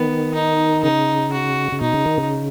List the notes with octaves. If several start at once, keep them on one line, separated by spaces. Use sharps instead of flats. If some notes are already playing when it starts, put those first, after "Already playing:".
Already playing: D#3 B3
D#4
C#3 D#4
F#4
C#3
B2 D#4
C#3
D#3
C#3